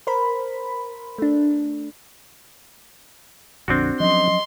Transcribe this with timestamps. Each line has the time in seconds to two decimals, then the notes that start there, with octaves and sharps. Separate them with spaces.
0.07 A#4 C5 B5
1.18 A3 D4
3.68 A#1 F2 D3 C4 D4 F#4
4.00 F3 F#3 C#4 D#5 C6